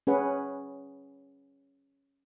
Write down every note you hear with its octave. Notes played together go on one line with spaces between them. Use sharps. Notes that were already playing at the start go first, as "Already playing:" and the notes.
C#4 G#4 B4 F#5